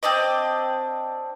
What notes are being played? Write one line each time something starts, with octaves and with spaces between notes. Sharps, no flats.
C4 D4 D5 D#5